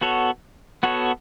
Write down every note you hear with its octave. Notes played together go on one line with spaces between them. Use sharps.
B3 F#4 A4 C#5
B3 F#4 A4 C#5